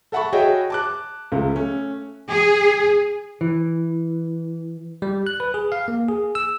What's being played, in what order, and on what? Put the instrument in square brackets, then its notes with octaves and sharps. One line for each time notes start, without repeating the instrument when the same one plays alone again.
[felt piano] A4 E5 F#5 A5 B5 C#6
F#4 G#4 C#5 D#5 E5 G5
A5 D6 F#6
C#2 C#3 A3
A3 C#4
[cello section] G#4
[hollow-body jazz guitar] E3
[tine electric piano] G3
F#6
B4
G#4
F5
A#3
G#4
E6